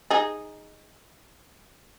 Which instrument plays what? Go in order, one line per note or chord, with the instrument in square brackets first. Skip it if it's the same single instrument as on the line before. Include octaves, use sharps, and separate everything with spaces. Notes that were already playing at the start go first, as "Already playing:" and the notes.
[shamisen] D#4 G#4